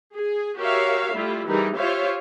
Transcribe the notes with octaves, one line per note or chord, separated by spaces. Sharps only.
G#4
F#4 G4 A#4 C#5 E5 F5
G3 A3 E4 F4
E3 G3 D#4 G4 G#4 A#4
F4 G4 C5 C#5 E5 F5